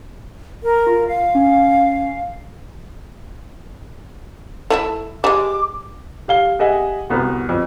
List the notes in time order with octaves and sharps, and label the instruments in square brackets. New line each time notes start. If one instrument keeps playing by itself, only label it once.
[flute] A#4
[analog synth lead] F4
[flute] F5
[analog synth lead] C#4
[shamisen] A3 E4 E5
[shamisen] G3 G#3 [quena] D6
[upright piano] G4 F5 G7
G4 G#4 D#5 E5 F#5 G#5
C2 B3 F#4
F2